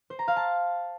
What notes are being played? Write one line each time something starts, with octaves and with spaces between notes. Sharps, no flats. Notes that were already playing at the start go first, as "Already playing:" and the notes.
C5
A#5
F5
A5